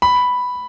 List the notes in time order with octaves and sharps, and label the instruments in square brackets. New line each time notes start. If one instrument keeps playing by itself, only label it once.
[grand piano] B5